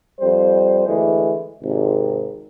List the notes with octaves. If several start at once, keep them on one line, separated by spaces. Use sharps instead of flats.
F2 G3 C5
D2 E3 G#3 A3
G#1 C3